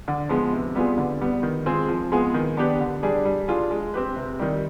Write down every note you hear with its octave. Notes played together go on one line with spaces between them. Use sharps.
D3
F3 G#3 B3 F4
C3
G3 B3 F4 G#4
D3
G3 B3
D#3
G#3 C4 F4 G#4
F3
G#3 B3 F4 G#4
D#3
B3 D4 G4 B4
D3
G3 D4 G#4
G3
D4 F4 G#4
G#3
C4 G4 B4
C3
D#3 G3